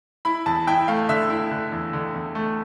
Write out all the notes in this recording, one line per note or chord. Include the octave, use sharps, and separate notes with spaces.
E4 B5
E2 A5
E4 G5
A3 F5
D3 E5
E4
D3
E2
D3
E2
A3